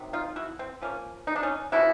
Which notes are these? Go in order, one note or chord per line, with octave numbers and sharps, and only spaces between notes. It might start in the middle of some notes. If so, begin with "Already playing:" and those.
Already playing: C3 D#3 F#3
D#4 F4
E4 F#4
C4
F3 A#3 C#4
D#4
D4
C#4 D#4
C#3 F3 A#3 E4 F#4